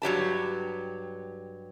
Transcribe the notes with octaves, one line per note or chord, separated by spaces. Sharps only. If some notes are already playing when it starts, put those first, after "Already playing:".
G2 F#3 G4 A5